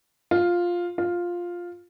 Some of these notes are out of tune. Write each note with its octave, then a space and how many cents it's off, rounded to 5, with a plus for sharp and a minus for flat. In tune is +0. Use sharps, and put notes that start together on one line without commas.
F4 +5
F4 +5